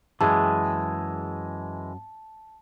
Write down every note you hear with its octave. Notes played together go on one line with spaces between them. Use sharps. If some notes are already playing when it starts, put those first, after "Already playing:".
F#2 E3 G#3 G#4 A5